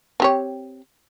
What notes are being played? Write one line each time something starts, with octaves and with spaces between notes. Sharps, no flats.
C4 G4 C#5